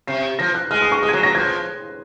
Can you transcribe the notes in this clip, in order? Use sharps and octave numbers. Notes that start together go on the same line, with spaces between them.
C3 C7
F3 A#6
F#6
G#3 F6
D#6
C#6
G#3 D#6
G#6
F#3 F#6
F#3 A#6
F3 G#6